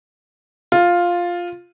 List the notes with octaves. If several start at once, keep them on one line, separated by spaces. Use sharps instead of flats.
F4